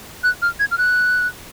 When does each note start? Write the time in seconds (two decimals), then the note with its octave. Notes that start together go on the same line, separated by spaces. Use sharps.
0.24 F#6
0.42 F6
0.60 G#6
0.71 F6
0.78 F#6